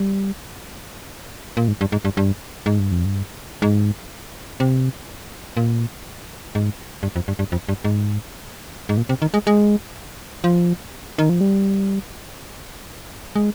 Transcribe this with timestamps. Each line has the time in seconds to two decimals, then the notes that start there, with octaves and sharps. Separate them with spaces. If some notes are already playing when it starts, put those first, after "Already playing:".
Already playing: G3
1.57 A#2
1.68 G#2
1.81 G2
1.92 G#2
2.05 G2
2.17 G2
2.66 G#2
2.79 G2
2.92 F2
3.05 G2
3.62 G#2
4.60 C3
5.57 A#2
6.55 G#2
7.03 G2
7.16 F2
7.28 G2
7.39 G2
7.52 F2
7.69 G2
7.84 G#2
8.89 G#2
8.97 A#2
9.09 C3
9.22 D#3
9.34 G#3
9.47 G#3
10.44 F3
11.18 D#3
11.29 F3
11.41 G3
13.36 G#3